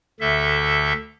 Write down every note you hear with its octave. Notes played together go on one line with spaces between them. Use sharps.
D2 D3 A4 E5